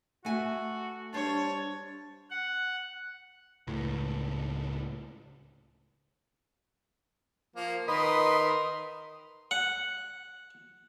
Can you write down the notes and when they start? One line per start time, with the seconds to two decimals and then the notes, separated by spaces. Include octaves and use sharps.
0.25 A3 F#4 G#5
1.14 G3 D4 C5 C#5 A5
2.31 F#5
3.67 C#2 A2
7.56 F3 A#3
7.88 D#3 A#4 B4 D#5 C6
9.51 F#5